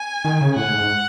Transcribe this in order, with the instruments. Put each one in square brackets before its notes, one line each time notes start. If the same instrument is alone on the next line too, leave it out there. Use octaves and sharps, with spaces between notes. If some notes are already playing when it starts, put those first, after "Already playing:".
Already playing: [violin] G#5
[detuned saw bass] D#3
C#3
[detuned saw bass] A2 [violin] F#5
[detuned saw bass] G#2
G#2